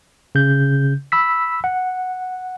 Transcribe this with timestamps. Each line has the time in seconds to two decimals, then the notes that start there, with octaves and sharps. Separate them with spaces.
0.35 C#3 G6
1.12 B5 E6 B6
1.64 F#5